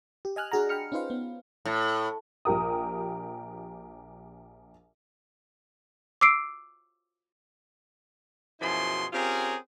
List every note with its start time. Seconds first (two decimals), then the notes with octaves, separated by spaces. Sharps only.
0.25 G4
0.36 D#5 G#5 F6 F#6
0.52 D4 F#4 G#4 F#5 A#5
0.69 G5 B5 F6 C#7
0.92 C#4 D#4 F4 B4 C5 F5
1.10 B3
1.65 A2
2.45 A#1 G4 A#4 D#6
6.21 D6 E6 C7 D7
8.61 F#2 B2 F3 E4 G#4 C6
9.13 C4 C#4 F4 G4 G#4 A#4